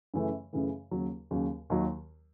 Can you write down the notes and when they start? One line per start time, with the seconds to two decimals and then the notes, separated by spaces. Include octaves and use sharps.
0.14 F#2 C#3 E3 A3
0.53 F#2 C#3 E3 A3
0.91 D#2 C#3 F#3
1.31 D#2 C#3 F#3
1.70 D#2 D#3 F#3